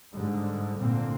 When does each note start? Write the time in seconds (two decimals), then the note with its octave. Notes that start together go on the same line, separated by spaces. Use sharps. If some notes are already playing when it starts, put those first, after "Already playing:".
0.14 G#2 D3 G3
0.79 A#2 D3 A#3 C4